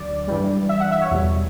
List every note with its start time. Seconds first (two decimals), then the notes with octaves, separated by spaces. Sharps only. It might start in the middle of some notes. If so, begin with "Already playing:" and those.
Already playing: D2 D3 F#3 D5
0.28 G2 E3 G3
0.69 E5
0.80 F#5
0.91 E5
1.01 C#5
1.11 E2 B2 G3